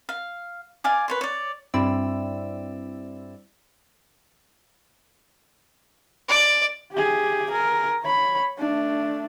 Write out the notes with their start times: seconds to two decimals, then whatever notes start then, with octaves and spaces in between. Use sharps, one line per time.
0.09 F5
0.84 D5 F5 G#5 D6
1.08 B4 C#5 C6
1.21 C#5 D5
1.74 G2 C4 E4 D5 E6
6.29 D5
6.93 G4 G#4
7.51 G#4 A#4
8.03 C#5 B5
8.59 A3 D4